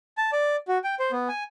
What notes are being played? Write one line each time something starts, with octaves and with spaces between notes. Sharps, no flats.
A5
D5
F#4
G5
C5
B3
G#5